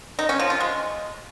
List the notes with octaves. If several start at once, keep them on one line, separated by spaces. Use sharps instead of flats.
D#4
C#4
F3
F4
G#3